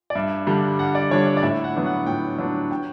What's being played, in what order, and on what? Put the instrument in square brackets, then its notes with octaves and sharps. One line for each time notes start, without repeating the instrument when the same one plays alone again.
[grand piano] D5
G2 E5
D3 G3 D4
G2 F#5
D5
D3 G3 D4 C#5
C#5
D5
A2 E5
F#5
F#3 B3 D4
F#5
A2 G5
F#3 B3 D4
G5